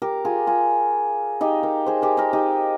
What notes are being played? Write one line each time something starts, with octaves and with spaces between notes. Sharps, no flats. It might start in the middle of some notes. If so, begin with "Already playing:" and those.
G4 A#4
F4 G#4
F4 G#4
D#4 G4
G4 A#4
G#4 C5
G4 A#4
G4 A#4
D#4 G4